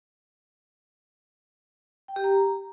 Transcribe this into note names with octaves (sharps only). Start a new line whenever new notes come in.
G5
G4
A#5